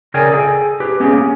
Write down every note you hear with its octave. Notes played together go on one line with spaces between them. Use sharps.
C#3 G#4 A#4 D5 G5 G#5
G#4 A4 C#5 F5 G5 G#5
G4 B4
B3 C#4 G4 G#4
A#3 C#4